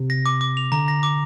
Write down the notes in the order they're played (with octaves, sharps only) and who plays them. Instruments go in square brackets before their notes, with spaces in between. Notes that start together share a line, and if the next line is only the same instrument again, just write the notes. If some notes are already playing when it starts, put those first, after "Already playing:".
Already playing: [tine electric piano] C3
[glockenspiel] A#6
D6
D6
F7
[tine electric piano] D3 [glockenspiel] A#5
[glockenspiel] A#6
D6